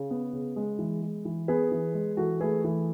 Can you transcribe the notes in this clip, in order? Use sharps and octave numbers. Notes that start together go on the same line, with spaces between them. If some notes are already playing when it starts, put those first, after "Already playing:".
Already playing: C#3
B3
C#3
G#3
E3
G#3
E3
B3 G#4 B4
E3
G#3
E3 F#4 A4
A3 G#4 B4
E3